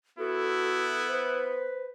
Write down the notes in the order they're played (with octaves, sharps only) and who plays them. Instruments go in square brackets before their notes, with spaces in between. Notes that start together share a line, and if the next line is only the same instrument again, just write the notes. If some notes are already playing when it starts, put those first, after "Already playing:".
[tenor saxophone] B3 [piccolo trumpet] E4 [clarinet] F#4 [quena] A4
[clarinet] B4 [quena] C5